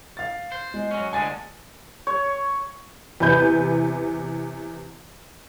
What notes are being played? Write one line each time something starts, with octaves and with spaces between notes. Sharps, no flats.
F5 A6
C5
G#3
F#3 C#4
D2 D3 G#3 G#5 A6
C#5
E2 C3 B4 G6